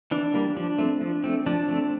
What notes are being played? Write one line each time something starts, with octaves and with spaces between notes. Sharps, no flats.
E3 D4
G3 A#3
F3 D4
A3 C4
F3
A3 C4
F3 D4
A3 C4